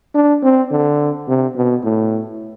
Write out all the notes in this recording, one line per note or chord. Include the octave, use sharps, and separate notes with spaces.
D4
C4
D3
C3
B2
A2